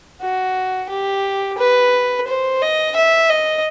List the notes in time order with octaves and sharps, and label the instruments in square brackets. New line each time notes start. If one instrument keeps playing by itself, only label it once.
[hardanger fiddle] F#4
G4
B4
C5
D#5
E5
D#5